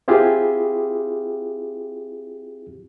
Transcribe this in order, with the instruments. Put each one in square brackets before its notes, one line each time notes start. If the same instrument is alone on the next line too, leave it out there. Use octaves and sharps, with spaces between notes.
[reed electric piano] C4 E4 F4 G4 G#4